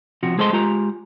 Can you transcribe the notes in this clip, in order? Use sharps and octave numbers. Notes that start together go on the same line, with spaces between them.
C3 F3 F#4
G#3 G#4 A4 C5 D#5 C6
G#3 F4 G4 A#5